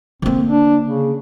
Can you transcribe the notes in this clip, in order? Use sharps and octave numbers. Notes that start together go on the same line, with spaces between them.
D3 A#3 C4
D4
C#3